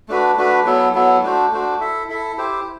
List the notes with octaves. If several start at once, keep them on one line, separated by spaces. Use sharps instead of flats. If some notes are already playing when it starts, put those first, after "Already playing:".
A3 D4 F#4 B4
A3 D4 F#4 B4
F#3 B3 E4 A4
F#3 B3 E4 A4
A3 D4 F#4 C5
A3 D4 F#4 C5
E4 A4 E5
E4 A4 E5
E4 G4 C5